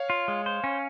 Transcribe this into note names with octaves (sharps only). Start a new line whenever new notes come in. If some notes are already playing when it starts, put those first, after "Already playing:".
Already playing: C#5 F5
F4
G#3
C5
C#4